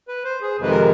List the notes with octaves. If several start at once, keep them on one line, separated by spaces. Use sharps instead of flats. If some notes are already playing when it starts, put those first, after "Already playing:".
B4
C5
G#4
F2 C3 D#3 G#3 B4
A#4